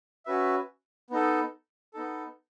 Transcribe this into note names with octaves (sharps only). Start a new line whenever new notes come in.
C#4 F#4 B4 E5
B3 D#4 A4
B3 D#4 A4